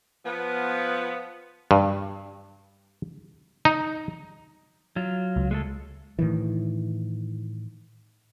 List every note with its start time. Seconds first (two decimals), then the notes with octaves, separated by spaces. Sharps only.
0.25 F3 B3
1.71 G2
3.65 D#4
4.96 F#3 F4
5.36 C#2
5.51 G#3 A3 A4
6.19 A2 D#3 E3